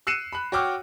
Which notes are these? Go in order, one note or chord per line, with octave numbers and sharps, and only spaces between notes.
E6 F#6 C7 C#7 D#7 E7
B5 F#6
F#4 C#5 G5 D6 E6 F6